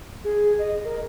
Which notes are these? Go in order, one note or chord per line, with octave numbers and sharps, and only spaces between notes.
G#4
D#5
A#4